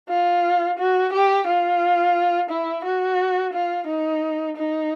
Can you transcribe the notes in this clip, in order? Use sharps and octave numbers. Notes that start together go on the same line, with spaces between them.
F4
F#4
G4
F4
E4
F#4
F4
D#4
D#4